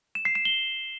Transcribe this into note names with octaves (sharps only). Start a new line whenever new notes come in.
E7
C7
E7
G7